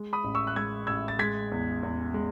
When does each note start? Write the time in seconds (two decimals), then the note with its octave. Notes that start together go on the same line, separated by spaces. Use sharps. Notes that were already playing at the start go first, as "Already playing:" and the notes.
Already playing: G#3
0.13 B5 D#6
0.24 A1
0.35 C#6 E6
0.47 F#6
0.56 G#3 E6 G#6
0.87 A1 E6 G#6
1.08 A6
1.19 G#3 G#6 B6
1.52 E2
1.83 E2
2.14 G#3